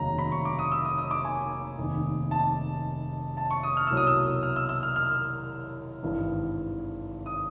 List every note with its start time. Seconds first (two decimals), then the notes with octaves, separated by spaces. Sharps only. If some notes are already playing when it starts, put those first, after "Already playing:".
Already playing: F1 D#2 C#3 F#3 A#5
0.18 B5
0.32 C#6
0.45 D6
0.59 D#6
0.72 E6
0.85 D#6
0.98 D#6
1.11 D6
1.25 G#5
1.78 F1 D#2 D#3
2.31 A5
3.37 A5
3.50 C#6
3.63 D#6
3.77 F6
3.87 C2 B2 F#3 E6
3.97 D#6
4.07 E6
4.43 F6
4.56 E6
4.69 E6
4.83 F6
4.96 F6
6.03 G#1 G2 E3
7.26 D#6